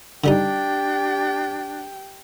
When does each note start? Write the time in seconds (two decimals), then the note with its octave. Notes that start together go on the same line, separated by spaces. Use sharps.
0.24 D3 G3 D4 D#4 G4 G5